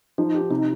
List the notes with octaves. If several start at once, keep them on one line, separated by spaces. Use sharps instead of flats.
F3 D#4
G4
C3 D#4